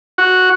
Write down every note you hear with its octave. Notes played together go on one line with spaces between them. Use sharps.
F#4